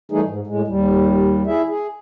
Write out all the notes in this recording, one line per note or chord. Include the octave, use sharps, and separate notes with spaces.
E3 G3 A3 D#4 G#4
G#2
A2 G#3
D#2 G3
E4 G#4 E5
G#4